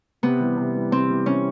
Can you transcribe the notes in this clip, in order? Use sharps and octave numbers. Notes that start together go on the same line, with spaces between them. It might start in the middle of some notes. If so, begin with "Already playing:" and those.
C3 B3
E3 G3
C3
E3 G3
C3 C4
E3 G3
C3 C#4